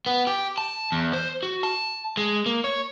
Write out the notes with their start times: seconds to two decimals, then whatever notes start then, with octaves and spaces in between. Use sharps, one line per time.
0.06 B3
0.27 G4
0.58 A5
0.92 E2
1.13 C5
1.43 F#4
1.63 A5
2.17 G#3
2.46 A#3
2.64 C#5